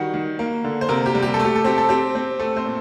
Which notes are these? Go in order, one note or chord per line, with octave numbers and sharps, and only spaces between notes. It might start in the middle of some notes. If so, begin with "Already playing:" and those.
Already playing: D#3 G3 F#4 F#5
D#3
A#3
D3
C5
C3 A#3 A#4
G4
G3
G4
A4
A3 G4
A4
C4 G4
A4
C4 G4
C4
A3 A4
C4 C5
A#2